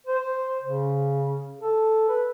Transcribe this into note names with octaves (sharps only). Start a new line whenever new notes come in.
C5
C#3
A4
B4